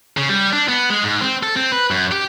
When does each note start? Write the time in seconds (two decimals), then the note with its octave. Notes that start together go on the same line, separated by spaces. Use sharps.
0.17 C#3
0.29 G3
0.53 D4
0.68 B3
0.90 G#3
1.03 G#2
1.21 C4
1.43 A4
1.56 C4
1.72 B4
1.91 F#2
2.12 G4